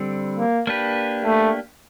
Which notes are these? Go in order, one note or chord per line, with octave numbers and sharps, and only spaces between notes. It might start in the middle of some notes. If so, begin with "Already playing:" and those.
Already playing: D3 G3 C4
A#3
A#3 D4 G4 B4
A3